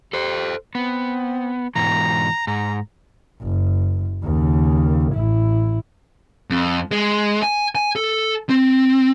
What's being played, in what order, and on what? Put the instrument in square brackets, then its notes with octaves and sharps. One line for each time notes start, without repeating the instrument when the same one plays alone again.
[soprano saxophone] G4 [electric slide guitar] A4 C5
[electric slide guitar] B3 [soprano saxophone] C4
[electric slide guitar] G#2 B2 E3 [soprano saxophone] A#5
[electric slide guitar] G#2 [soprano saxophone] A#5
[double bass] F#1
D#2 C#3
A1 E4
[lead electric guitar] F2
G#3
G#5
G#5
A4
C4